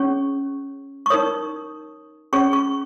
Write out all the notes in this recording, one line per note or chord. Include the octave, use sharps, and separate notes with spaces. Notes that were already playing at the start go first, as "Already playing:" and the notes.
Already playing: C#4 G#4 C#5 C#6
C#6
D#4 A#4 C#5 D#6
C#4 G#4 C#5 C#6
C#6